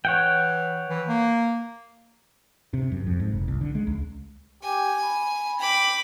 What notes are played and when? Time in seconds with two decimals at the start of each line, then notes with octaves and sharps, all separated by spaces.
0.05 E3 C#5 F#5 G5
0.89 E3
1.08 A#3
2.74 C3
2.92 F#2
3.07 F2
3.20 G#2
3.32 F1
3.48 C2
3.61 D3
3.75 G#3
3.87 C#2
4.63 G4 G#5
5.03 B5
5.59 G5 B5 D6